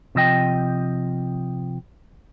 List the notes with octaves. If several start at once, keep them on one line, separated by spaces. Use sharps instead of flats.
C3 F3 D#5 G5